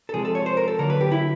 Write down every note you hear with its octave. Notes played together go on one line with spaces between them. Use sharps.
A4
C3 F3 G#3 G#4
A4
C#5
C5
A#4
A4
D3 F#3 A#3 A#4
B4
G4
E4